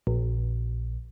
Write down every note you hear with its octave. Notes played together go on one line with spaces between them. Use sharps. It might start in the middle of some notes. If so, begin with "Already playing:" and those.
A#1